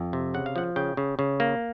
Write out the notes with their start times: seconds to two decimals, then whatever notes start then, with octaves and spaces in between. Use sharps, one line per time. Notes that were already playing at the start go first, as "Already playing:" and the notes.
Already playing: F2
0.13 C3
0.34 C#3 F#5
0.46 F5
0.56 F3 F#5
0.76 C#3 G5
0.97 C#3
1.19 C#3
1.40 A#3